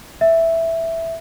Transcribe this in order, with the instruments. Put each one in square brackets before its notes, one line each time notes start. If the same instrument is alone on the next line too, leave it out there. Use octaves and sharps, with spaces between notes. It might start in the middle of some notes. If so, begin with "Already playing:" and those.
[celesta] E5